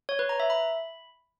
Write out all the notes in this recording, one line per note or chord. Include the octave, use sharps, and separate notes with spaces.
C#5
B4
A#5
E5
B5